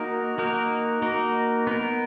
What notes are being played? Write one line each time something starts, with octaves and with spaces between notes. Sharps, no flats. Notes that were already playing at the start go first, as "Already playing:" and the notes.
Already playing: A#3 D#4 F#4 A#4
A#3 D#4 F#4 A#4
A#3 D#4 F#4 A#4
B3 D#4 A#4